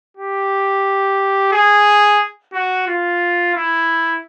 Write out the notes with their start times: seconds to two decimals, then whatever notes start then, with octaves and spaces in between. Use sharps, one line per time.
0.17 G4
1.52 G#4
2.54 F#4
2.88 F4
3.55 E4